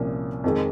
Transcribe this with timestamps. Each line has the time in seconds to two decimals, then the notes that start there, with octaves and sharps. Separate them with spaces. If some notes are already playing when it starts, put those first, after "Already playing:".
Already playing: C2 A#2 F3 A#3 C#4
0.44 F2 D#3 G#3